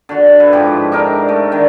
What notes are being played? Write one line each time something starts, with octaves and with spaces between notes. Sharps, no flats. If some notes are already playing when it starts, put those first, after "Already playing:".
D3 F#4
E4 B4
G#2 F3 G4
D4 D#4 A#4 E5
A3
D3 D#3